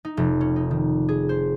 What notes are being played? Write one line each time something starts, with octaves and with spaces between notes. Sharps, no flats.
D#4
F1
C#4
D#4
D#3
G#4
C5